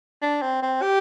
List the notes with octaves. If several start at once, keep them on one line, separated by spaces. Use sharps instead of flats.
D4
C4
C4
G4